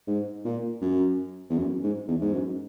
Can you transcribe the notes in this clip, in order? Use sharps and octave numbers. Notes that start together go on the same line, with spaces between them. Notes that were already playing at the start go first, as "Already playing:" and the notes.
G#2
A#2
F#2
E2
F#2
G#2
E2
G#2
F#2